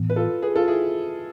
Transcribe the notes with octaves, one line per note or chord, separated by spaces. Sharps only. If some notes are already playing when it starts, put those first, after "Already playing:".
Already playing: A2 E3 B3
B4
F4 A4
G#4 B4
F4 A4
E4 G#4